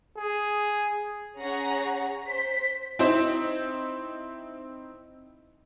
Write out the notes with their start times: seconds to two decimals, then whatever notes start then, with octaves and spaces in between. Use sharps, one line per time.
0.17 G#4
1.40 C#4 G#4 C#5 F#5 A#5 A#6
2.27 C5 B6
2.99 C4 D#4 E4 C5